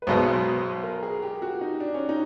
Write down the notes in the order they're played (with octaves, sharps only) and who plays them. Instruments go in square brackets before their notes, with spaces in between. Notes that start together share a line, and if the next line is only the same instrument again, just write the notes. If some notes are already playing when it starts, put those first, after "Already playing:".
[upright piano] B4
[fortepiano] B1 B2 G#3 B3 [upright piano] C5
[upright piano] A#4
G#4
G4
F#4
D#4
D4
C#4
D#4